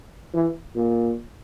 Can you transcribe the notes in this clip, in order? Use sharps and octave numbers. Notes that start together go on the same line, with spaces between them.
E3
A#2